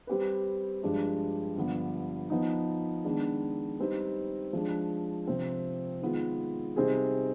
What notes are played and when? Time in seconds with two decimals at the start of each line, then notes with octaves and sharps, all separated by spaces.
0.07 G3 C4 G4 B4
0.83 G2 F3 G#3 D4 G4
1.56 G2 D3 F3 B3
2.30 F3 B3 D#4
3.04 D#3 G#3 B3 D4
3.79 G3 C4 D#4 B4
4.53 F3 G#3 D4
5.27 C3 F3 C4
6.02 D#3 G#3 B3 F4
6.76 C3 G3 C4 D#4 G#4